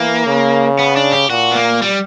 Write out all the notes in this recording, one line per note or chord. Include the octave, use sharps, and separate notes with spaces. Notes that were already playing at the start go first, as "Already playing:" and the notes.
Already playing: E3 A#3
C#3
B3
D4
G4
A#2 F#4
B3
A#3
G3